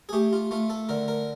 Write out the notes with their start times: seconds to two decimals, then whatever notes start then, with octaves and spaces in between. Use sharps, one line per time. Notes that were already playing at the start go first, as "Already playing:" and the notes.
0.09 G#4
0.13 A3 G4
0.33 F4
0.51 A3 F4
0.70 A4
0.89 D3 A#4
1.08 A#4